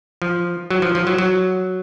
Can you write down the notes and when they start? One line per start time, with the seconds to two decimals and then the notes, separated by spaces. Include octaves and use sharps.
0.22 F3
0.70 F#3
0.82 F3
0.95 F3
1.07 F#3
1.18 F#3